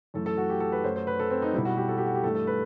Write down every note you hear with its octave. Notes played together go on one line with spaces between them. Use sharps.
F#2 E3 A3 A4
A4
F#4
G4
A4
B4
F#2 F#3 A3 C5
C5
B4
A4
C4
D#4
B2 G3 E4
F#4
G4
A4
G4
F#4
G4
G2 E3 A3 A4
A4
B4